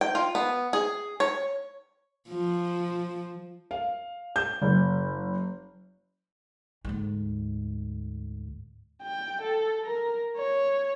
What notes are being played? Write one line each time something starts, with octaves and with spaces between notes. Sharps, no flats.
G5
F4
B3
G#4
C#5
F3
F5
G6
F#1
D2 G#2
G5
A4
A#4
C#5